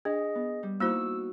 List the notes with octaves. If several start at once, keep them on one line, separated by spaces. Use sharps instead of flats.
D4 G#4 D#5
B3
G3
A#3 D#4 E4 F#4 C5 E6